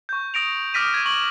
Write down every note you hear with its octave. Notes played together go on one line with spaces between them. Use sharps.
C#6 G6
D#6 A#6 D7 F7
D6 D#6 F6 A#6 B6 D#7
G#6 D#7
C#6 F#7